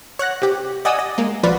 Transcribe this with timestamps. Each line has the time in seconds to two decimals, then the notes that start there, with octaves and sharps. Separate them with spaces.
0.19 C#5 F#5 F#6 A#6
0.42 C3 G4
0.85 D5 D#5 F#5 G#5 D#6 E6
0.99 D#5
1.18 G#3 A#3
1.43 A#1 F3 F4 F#4 B4 D5